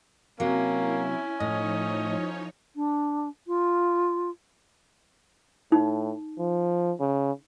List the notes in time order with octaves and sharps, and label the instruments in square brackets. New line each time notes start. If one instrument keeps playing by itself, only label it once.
[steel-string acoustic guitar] C3 F#3 [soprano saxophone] A#3 [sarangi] C#4 [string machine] E4
[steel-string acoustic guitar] A2 [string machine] F3 D#4 C#5 [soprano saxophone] D#5
[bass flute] D4
F4
[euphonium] A2 [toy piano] D#4
[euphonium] F3
C#3